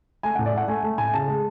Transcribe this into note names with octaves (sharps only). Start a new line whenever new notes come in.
A3 G#5
A2 F#5
D5
A3 F#5
A3 G#5
A3
A2 G#5
C#3 A5
G#3